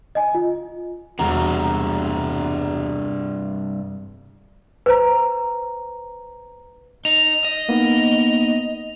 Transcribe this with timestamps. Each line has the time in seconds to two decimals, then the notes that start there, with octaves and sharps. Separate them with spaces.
0.15 D#5 G#5
0.35 F4
1.19 E1 G2 C3 F#4 A#5
4.86 B4 C5 A#5
7.05 D#4 F7
7.45 D#5
7.69 A#3 B3 D#4